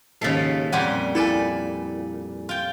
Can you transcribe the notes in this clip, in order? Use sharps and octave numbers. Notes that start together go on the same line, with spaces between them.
A#1 D#2 G#2 C#3 A4 A6 B6 C7
F2 A#2 G3 F#5 G#5 C6
E4 A4 B4 D5 G#5
F4 G5